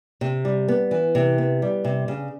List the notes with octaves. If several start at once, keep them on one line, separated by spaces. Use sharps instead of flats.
C3
G3
B3
E3
C3
B3
G3
C3
C#3